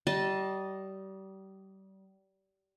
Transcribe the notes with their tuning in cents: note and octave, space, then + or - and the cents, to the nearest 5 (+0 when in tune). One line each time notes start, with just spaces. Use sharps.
G3 -30 D#5 +0 A5 +0